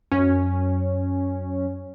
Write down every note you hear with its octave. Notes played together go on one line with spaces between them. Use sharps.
F#2 C#4